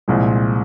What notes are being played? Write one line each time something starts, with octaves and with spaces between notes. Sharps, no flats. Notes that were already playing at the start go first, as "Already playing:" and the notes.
C2 A#2 F3 G#3